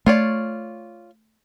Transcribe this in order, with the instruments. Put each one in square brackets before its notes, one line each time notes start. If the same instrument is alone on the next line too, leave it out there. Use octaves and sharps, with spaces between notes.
[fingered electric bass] A3 [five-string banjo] F4 C#5 D5